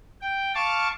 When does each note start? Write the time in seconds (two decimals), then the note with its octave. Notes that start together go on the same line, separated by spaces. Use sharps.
0.21 G5
0.54 F5 A5 C#6 D6